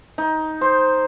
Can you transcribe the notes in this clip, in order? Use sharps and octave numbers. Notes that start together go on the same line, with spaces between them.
D#4
C5